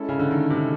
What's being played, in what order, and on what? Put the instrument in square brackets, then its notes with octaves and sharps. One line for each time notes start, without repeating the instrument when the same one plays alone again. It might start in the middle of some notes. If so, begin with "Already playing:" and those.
Already playing: [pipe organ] G#3 C#4 E4 A4
[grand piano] C#3
D3
D#3
C3